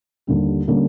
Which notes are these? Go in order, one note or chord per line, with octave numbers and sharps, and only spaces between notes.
D#2 D3 G3
D3 G3 A#3 C#4